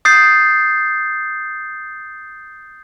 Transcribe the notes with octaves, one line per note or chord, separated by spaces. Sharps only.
D#6 G6 A6 C7